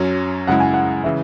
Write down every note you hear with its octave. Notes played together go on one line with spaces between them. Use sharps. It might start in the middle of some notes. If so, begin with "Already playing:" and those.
Already playing: F#2 F#3 C#4
F#2 C#3 G#3 E4 F#5
G#5
F#5
C#3 E3 E5